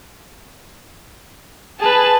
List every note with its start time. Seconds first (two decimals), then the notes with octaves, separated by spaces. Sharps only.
1.80 G#4 B4 A5